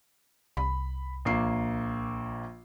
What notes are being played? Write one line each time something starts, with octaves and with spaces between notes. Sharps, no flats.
C2 B5
A#1 A#3 C7